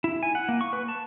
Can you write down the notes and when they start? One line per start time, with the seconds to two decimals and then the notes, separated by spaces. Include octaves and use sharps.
0.04 E4
0.23 G#5
0.35 F#5
0.49 A#3
0.61 C#6
0.73 B4
0.88 A5